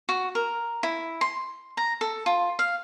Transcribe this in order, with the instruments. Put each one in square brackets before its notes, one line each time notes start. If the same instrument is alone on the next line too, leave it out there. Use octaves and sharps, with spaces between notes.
[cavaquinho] F#4
A#4
E4
C6
A#5
A4
F4
F5